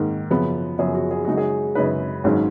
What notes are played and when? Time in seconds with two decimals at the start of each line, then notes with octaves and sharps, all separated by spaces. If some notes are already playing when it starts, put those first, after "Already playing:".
Already playing: G#2 D#3 A#3
0.30 F#2 C#3 F3 B3
0.79 F#2 C#3 F3 B3 G#4
0.95 F#4
1.11 G#4
1.25 F#2 C#3 G#3 D#4 F#4
1.37 G#4
1.75 F#2 C#3 G#3 D#4 B4
2.24 G#1 G#2 F#3 C#4